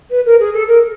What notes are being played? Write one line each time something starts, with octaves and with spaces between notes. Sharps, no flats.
B4
A#4
G#4
A4
A#4